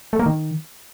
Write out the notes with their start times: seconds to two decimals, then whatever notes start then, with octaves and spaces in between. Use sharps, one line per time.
0.13 A3
0.19 A#3
0.26 D#3